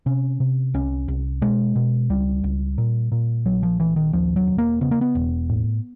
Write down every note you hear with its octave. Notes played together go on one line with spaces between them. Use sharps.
C3 C#4
C3
C2 C#4
C2
B2 G#3
B2
C#2 G3
C#2
A#2
A#2
A#1 F#3
F3
A#1 E3
D#3
D#2 F3
F#3
E1
A#3
C#3 B3
A#3
B3
E1
A2